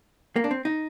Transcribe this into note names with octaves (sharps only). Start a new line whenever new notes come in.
A#3
D4
C4
D#4